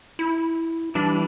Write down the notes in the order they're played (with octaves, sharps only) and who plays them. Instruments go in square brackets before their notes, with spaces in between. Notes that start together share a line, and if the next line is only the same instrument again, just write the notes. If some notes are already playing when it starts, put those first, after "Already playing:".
[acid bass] E4
[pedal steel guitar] E3 G3 D5 [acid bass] D4